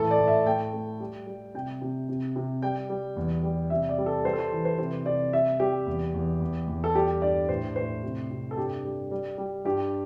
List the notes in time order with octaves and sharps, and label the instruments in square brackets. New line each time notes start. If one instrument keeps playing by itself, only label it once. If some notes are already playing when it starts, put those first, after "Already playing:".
Already playing: [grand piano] A2 E3 A4
D5
A2
E5
A3 G5
A3
G3
G3
C3 G5
C3
C3
C3
G3 G5
G3
E2
G3
C3 E5
D5
G3
A4
G3 C5
A4
C5
E3
C5
C3 C5
C3 D5
G3 E5
G3 G4
E2
E2
E2
E2
A4
G3 G4
G2 D5
A2 C5
A2 C5
C3
C3
A4
G2 G4
G3
G3
G3
G2 G4